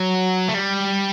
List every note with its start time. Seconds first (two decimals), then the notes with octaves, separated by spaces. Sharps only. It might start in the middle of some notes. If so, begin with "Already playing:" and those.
Already playing: F#3
0.48 A3
0.54 G3